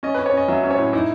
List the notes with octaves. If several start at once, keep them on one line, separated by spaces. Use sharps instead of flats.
C#4 D#5
C#4 B4
C#5
C#4 D#5
F#3 E5
C#4
C#5
A2
D#4 E4